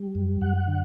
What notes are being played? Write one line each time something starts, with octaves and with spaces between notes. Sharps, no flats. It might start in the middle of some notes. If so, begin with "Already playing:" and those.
Already playing: G3
F#2
F#2 F#5
D3